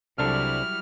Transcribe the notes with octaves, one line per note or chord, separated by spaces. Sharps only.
C2 F#3 G3 D4 E4 A4 F6